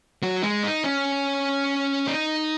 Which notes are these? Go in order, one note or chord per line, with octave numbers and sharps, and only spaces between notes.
F#3
G#3
D#4
C#4
D#4